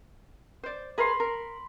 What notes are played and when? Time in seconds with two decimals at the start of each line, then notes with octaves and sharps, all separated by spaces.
0.63 C5 D5
0.98 G#4 A#4 B4 B5 C6
1.20 A#4